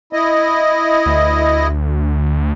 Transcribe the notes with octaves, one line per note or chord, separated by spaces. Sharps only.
E4 D#5
D2